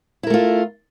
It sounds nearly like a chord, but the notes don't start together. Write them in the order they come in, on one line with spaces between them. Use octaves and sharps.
E4 A#4 A3 F4